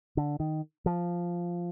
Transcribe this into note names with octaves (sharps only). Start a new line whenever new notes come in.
D3
D#3
F3